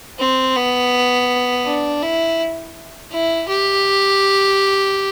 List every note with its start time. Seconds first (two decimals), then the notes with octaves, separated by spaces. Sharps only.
0.19 C4
0.56 B3
1.66 D4
2.02 E4
3.11 E4
3.49 G4